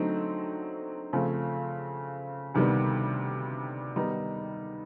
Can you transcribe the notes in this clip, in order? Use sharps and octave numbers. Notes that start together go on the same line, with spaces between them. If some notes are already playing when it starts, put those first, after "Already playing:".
Already playing: D3 F#3 A3 C4 D#4
C#3 F3 A3 C4
D2 C3 D#3 G3 B3
D#3 G3 B3 D#4